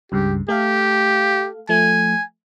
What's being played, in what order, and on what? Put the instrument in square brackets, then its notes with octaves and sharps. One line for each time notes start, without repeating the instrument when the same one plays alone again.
[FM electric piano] C#2 G2 C#3 [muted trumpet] G4
[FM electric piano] A3 A4 F5 [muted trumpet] G4
[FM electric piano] F3 A3 [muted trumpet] G#5